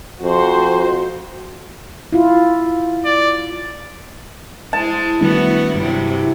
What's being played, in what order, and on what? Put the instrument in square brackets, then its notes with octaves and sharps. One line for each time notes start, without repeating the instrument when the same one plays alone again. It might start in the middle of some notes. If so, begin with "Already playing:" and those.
[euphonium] F2 [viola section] F#4 C5
[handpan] E4 F4
[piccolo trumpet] D5
[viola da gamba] G#3 C5 [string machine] E4 [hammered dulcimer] A5
[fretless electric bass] D#3 G3 D4 [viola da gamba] A3 B3 F#4
[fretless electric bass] G2 [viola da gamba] C3 F#3 G3